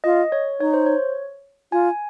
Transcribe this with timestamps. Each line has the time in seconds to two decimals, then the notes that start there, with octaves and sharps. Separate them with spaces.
0.04 F4 D#5
0.32 C#5
0.60 D#4 C#5
0.74 C5
0.86 C#5
1.72 F4 G#5